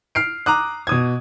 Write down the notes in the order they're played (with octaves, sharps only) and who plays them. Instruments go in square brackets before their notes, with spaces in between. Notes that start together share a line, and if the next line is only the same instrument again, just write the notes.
[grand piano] F6 C7 D7
A#5 D6 D#6 F#6
B2 D#6 G#6